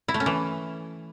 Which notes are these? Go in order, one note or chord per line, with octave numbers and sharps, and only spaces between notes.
E4
A3
C#4
E3